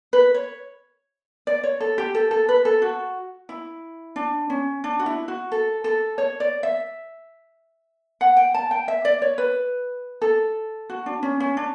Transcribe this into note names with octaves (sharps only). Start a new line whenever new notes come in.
B4
C#5
D5
C#5
A4
G4
A4
A4
B4
A4
F#4
E4
D4
C#4
D4
F#4
E4
F#4
A4
A4
C#5
D5
E5
F#5
G5
A5
G5
E5
D5
C#5
B4
A4
F#4
D4
C#4
C#4
D4